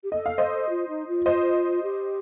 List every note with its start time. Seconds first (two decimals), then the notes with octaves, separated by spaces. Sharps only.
0.03 G4
0.12 A4 D#5
0.26 F5
0.38 C5 D#5
0.69 F4
0.88 D#4
1.07 F4
1.26 C5 D#5
1.83 G4